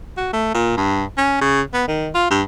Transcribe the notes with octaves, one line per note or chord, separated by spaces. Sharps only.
F#4
A3
A#2
G2
C#4
C#3
B3
D#3
F4
G2